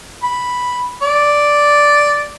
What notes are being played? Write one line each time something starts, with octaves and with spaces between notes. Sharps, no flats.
B5
D5